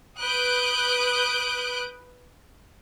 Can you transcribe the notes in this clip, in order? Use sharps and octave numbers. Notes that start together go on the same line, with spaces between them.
B4 D#6 F#6 G6 D7